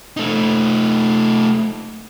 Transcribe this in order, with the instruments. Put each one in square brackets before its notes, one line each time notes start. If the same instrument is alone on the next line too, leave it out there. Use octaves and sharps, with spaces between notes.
[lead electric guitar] A3 D#4